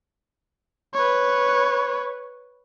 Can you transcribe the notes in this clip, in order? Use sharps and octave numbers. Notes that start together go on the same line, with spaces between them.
B4 C#5